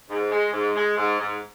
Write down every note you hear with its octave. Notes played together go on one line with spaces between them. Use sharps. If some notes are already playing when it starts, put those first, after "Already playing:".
G#2
G#3
G#2
G#3
G#2
G#2